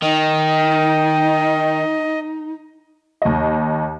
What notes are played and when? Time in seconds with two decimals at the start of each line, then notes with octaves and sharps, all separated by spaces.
0.03 D#3 D#4 D#5 G5
3.22 D#2 D#5